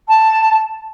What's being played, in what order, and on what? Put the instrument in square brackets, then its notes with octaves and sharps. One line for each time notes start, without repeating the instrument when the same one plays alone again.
[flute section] A5